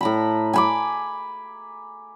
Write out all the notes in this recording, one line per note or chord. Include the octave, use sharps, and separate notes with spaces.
A2 A#5 B5
G#5 B5 D6